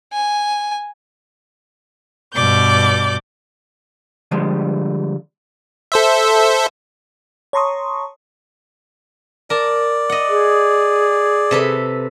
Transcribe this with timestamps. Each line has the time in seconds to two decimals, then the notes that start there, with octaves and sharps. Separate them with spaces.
0.13 G#5
2.34 G2 B2 D5 D6 G6
4.31 D3 F3 G3 G#3
5.92 A4 C5 E5
7.53 C#5 A5 A#5 C6 C#6 D#6
9.50 A#4 D5 A5
10.09 D#5 F#5
10.29 G#4
11.51 C3 A4 B4